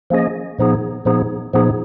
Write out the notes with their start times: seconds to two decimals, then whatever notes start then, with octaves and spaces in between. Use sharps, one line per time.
0.10 F3 A#3 C#4 G#4 D#5
0.58 A#2 F3 B3 D#4 G#4
1.05 A#2 F3 B3 D#4 G#4
1.53 A#2 F3 B3 D#4 G#4